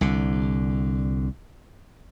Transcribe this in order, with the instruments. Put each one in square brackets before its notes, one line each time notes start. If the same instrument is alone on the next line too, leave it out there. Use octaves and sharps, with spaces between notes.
[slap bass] C2 D3